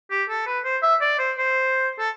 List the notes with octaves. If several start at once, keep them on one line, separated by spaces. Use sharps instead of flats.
G4
A4
B4
C5
E5
D5
C5
C5
A4